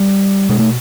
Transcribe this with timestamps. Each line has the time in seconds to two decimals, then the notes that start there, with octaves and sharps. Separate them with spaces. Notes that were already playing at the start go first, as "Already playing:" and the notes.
Already playing: G3
0.49 B2 G#3
0.59 A3